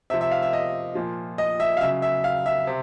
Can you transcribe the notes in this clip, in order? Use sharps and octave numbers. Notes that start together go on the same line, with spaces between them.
C3 F3 E5
E5
F5
E5
D#5
A#2 F3
D#5
E5
F5
C#3 F#3 E5
E5
F5
E5
C3